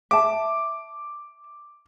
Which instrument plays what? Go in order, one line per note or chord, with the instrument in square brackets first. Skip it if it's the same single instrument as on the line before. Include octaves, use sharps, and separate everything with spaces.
[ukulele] E5 A5 [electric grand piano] D6